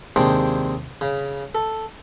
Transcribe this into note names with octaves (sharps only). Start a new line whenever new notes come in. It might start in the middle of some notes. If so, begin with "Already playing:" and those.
D#2 C3 G#3 C4 D4
C#3
A4